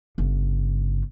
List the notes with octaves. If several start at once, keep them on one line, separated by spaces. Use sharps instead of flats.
G1 C#3